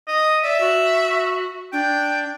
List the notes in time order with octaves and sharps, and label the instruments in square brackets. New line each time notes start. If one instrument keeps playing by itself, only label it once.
[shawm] D#5
[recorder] D5 [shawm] E5
[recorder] F#4
[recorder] D4 [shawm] G5